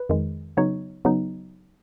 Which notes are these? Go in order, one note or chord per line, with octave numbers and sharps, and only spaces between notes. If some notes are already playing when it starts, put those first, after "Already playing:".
Already playing: B4
F2 D#3 G#3
C#3 F#3 B3 D#4 C#5
C#3 F#3 B3 D#4